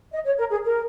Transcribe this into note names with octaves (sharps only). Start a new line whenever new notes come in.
D#5
C#5
A#4
G#4
A#4